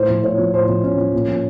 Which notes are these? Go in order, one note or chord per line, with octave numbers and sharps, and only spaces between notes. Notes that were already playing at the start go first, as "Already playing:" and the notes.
Already playing: A2 C5
F3
A2 C#5
F3
A2 C5
F3
A2 C#4
F3
A#2
F3